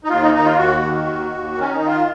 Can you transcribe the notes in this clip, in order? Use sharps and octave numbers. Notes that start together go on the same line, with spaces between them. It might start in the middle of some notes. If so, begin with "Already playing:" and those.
D#4
D#2 F4
D#4
D#2 D#4
F4
D#2 F#4
D#3
D#2
D#2
D#3
C#4
D#4
D#3
F4